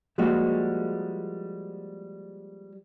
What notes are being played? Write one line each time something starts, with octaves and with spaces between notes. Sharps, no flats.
F3 G3 G#3 A#3 F#4